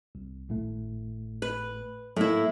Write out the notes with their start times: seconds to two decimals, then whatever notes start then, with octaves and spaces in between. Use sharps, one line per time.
0.15 C2
0.49 G#1 A2 A3
1.42 B4
2.16 A2 F#3 A#3 E4